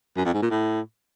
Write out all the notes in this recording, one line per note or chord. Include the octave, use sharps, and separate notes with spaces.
F#2
F2
G#2
A#2
A2